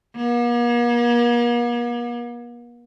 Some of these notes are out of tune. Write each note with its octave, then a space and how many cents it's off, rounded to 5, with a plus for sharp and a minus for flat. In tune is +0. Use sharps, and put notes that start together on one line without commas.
A#3 +45